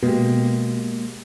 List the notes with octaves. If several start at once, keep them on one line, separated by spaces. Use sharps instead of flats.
B2 G#3 A#3 G4